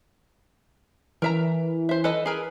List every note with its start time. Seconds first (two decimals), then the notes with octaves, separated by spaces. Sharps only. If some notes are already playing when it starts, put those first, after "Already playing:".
1.22 E3 A#4 E5 A#5
1.89 C5 E5
2.04 A4 B4 D#5
2.26 G#4 A#4 B4